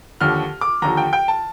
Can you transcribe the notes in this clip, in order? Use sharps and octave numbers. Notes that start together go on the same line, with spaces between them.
D#2 D3 F3 F6
D6
D#2 D3 F3 A#5
G5
G5
A5